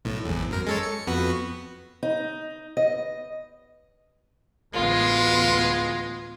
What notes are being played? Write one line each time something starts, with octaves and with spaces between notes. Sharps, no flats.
B1 A2
G#1 E2
F#2 A#4
G#3 A4 C#5
C#7
F2 B3 F#4
D#4
D#5
A1 D2 G#3 B3 F4